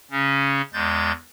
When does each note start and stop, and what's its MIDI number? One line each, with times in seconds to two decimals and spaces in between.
0.11 0.61 49
0.11 0.61 61
0.73 1.12 40
0.73 1.12 56
0.73 1.12 91
0.73 1.12 93